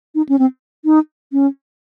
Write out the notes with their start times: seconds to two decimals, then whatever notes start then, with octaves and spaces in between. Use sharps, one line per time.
0.15 D#4
0.29 C#4
0.39 C4
0.85 D#4
1.32 C#4